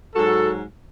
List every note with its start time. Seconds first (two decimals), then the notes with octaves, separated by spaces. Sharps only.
0.15 G#2 F#3 F#4 A4